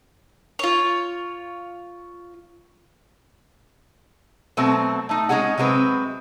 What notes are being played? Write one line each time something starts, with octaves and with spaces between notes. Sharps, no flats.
F4 C#5
B2 F#3 A3 C4
A3 D#4
G#3 C#4 D#4 G#4 F#5
C3 F#3 G#3 C4 B4